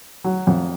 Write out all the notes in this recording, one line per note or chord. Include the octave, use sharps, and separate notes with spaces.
F#3
F2